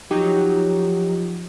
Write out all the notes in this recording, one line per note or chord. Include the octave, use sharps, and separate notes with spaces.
F3 F#3 D#4 G4